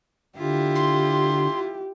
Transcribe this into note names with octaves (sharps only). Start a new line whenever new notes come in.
D3 E4 F4 G4
C6